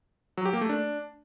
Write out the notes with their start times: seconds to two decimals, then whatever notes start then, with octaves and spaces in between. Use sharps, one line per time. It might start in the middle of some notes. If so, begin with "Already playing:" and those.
0.37 F#3
0.45 G4
0.53 A#3
0.61 A3
0.69 D4